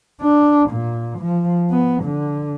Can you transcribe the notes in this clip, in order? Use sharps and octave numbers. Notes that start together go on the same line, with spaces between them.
D4
A#2
F3
B3
D3